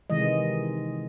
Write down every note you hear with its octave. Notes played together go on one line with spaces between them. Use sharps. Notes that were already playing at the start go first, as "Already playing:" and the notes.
C3 D#3 E3 G#3 D#5